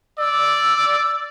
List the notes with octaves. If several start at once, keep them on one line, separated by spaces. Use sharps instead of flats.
D5 E6